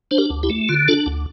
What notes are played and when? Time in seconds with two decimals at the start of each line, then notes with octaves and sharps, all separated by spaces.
0.11 D4 C5
0.18 G4 A#4
0.30 D2
0.43 E4 G4
0.50 A3
0.69 D3 F4
0.88 D4 F4 A4
1.06 D2